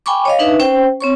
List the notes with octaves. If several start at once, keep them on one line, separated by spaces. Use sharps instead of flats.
G5 G#5 B5 C#6 D6
C#5 D#5 F5
D4 D#4 B4 E5
C#4 C5 G5
C4 C#5 C#6